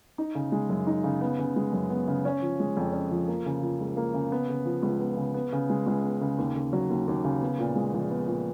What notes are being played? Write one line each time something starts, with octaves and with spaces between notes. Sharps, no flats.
D#4
C#3
G#3
F#2
D#4
C#3
B3
C#3
G#3
F#2
B3
C#3
C#4
F3
G#3
F2
C#4
F3
A#3
C#3
F3
C#2
A#3
C#3
B3
C#3
F3
C#2
B3
C#3
B3
C#3
G#3
C#2
B3
C#3
D#2
C#3
F#3
D#2
D#2
C#3
B3
A#2
G#3
A#1
B3
A#2